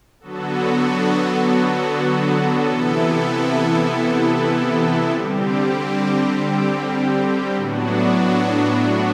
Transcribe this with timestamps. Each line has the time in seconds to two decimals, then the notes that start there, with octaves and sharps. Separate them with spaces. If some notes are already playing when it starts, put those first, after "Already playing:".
0.20 D3 F#3 B3 F#4 A4
2.66 C3 E3 B3 E4 A4
5.11 D3 G3 C4 G4
7.56 A2 F#3 B3 D4 F#4